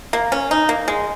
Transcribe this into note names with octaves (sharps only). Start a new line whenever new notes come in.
A#3
C#4
D#4
A#3
G#3